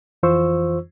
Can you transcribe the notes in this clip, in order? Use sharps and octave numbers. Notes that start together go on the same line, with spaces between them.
F2 E3 F4 C5 C#6 E6